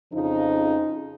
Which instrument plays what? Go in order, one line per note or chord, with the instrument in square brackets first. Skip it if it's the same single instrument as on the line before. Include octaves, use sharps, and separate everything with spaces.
[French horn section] F2 C#3 F3 D#4